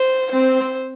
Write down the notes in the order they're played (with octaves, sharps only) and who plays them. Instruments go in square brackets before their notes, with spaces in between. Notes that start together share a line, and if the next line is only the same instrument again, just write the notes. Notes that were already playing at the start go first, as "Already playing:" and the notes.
Already playing: [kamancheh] C5
[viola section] C4 [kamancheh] C5